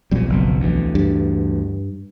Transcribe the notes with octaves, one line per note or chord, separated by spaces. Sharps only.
B1 F2 A#2 G3
F#1 B2
D2 E3
G2